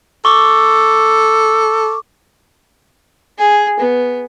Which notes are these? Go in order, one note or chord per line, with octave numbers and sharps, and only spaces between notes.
A4 C#6 D6
G#4
B3